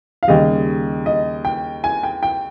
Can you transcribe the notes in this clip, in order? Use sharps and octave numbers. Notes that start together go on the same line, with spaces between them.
F5
D#2 C#3 G3 D#5
D#5
G5
G#5
G5
G5